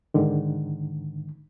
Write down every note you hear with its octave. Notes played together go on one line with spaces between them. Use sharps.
G#2 D3 D#3